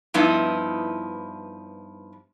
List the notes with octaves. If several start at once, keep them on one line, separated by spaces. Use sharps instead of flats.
G2 F3 B3 D#4 E4